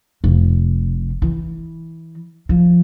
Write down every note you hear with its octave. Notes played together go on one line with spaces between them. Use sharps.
F1
E3
F3